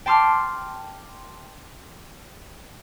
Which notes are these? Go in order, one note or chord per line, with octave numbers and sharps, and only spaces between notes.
G5 A5 C6 D6 F6